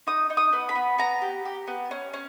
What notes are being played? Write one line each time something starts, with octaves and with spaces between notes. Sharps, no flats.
D#4 D#6
D#4
D#6
B3
B5
B3
B3 A#5
G4
G4
B3
C#4
C#4